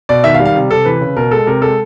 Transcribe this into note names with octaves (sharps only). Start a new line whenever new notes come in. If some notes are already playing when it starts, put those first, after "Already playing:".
B2 D5
D#3 E5
F5
G3
F5
C3
C3 A4
E3 B4
C#3
B2 A#4
G#3 A4
C3 A#4
G#3 A4